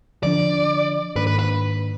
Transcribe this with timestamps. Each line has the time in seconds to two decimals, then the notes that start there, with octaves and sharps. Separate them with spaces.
0.23 D3 F3 B3 D4 D5
1.16 G#2 D#3 A#3 D4 B4
1.27 B4
1.39 B4